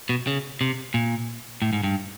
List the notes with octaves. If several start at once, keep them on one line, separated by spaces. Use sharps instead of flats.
B2
C#3
C3
A#2
A2
G#2
G2